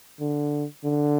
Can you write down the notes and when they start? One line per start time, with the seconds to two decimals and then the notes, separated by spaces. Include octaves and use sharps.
0.20 D3
0.84 D3